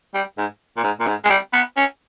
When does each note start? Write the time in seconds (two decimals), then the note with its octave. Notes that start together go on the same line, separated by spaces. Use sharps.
0.15 G3
0.38 G#2
0.77 A#2
0.84 G#2
1.00 A#2
1.07 G#2
1.25 G#3
1.30 G3
1.53 B3
1.77 C#4